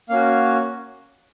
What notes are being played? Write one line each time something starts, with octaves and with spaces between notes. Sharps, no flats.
A#3 C#4 F#4 F5